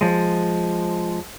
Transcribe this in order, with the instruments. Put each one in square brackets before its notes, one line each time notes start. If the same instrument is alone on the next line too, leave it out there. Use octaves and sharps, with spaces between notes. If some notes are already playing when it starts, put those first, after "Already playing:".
[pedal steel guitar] F3 G#3